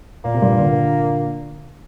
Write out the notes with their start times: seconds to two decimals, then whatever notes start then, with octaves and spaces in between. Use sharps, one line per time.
0.24 A#2 A#3
0.34 C3
0.42 G2 A#2
0.59 A#2 D3